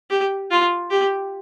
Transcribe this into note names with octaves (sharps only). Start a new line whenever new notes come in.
G4
F4
G4